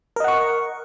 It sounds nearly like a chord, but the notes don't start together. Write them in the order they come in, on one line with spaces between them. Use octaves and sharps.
A#4 D#5 F#5 C#6